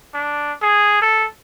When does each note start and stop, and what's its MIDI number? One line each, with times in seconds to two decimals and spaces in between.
0.14 0.53 62
0.62 0.98 68
1.02 1.27 69